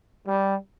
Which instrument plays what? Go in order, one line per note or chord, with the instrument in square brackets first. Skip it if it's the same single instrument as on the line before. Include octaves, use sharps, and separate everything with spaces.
[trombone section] G3